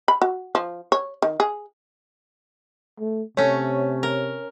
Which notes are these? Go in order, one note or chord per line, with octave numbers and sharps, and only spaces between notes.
B5
F#4
F3
C#5
D#3
G#4
A3
C3 A3 C#4 C#5
A#4